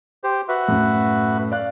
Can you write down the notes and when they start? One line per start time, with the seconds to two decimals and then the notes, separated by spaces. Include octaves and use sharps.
0.24 G4 C5
0.48 F#4 B4 E5
0.68 F#2 A2
1.52 D5 F5 F#6